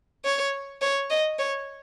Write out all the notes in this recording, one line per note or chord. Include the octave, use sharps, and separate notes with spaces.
C#5
C#5
D#5
C#5